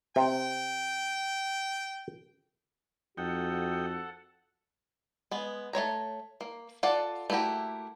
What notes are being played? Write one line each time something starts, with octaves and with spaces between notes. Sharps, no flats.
C3 G5
F2 D#4 F#4 A4 F#5 G5
G#3 B3
A3 C4 C#5 A#5
A#3
F4 A4 D5 F#5
A3 A#3 E4 F#4 G4